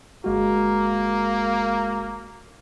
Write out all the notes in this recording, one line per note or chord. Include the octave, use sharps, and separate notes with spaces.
G1 G#3 A#3 F#4